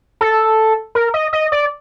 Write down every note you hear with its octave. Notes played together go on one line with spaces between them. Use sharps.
A4
A#4
D#5
D#5
D5